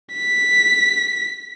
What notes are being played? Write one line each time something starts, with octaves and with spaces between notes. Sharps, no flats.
B6